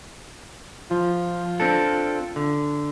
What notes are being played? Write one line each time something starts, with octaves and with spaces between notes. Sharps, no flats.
F3 F4
C4 D4 A4
D3